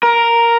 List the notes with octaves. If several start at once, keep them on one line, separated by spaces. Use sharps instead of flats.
A#4